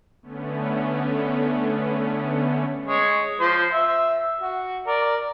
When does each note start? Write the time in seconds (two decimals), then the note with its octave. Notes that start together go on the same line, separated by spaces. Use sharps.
0.22 D3 A3 B3 C#4
2.86 G#3 C#5
3.40 F3 C5
3.73 E5
4.41 F#4
4.87 A#4 D5